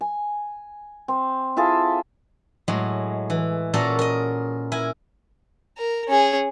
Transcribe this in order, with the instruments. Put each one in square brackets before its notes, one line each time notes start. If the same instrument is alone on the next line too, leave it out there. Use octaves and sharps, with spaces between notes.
[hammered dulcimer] G#5
C4
E4 F4 G#4 A4
[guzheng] A2 F#3 G#3
E3
A#2 C#4 F#4 A4 A#4 A#5
A#4 D#5
E4 A#4 G#5
[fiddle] A#4
C#4 G#4